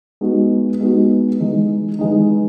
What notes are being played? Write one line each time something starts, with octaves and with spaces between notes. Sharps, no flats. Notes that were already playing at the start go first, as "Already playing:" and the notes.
G#3 B3 D#4 F#4
G#3 B3 D#4 F#4
E3 G#3 D#4
E3 G#3 D#4